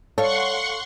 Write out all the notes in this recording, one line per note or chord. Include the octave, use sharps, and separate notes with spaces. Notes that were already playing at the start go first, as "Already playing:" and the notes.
A4 C#5 F5 F#5 C6 C#6